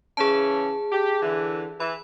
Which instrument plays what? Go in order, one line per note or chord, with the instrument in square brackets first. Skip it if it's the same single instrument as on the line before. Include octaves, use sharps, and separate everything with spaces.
[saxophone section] C#3 E3 C#4 [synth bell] G#4 A5
[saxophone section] G4
D3 E3
[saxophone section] E3 [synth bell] B5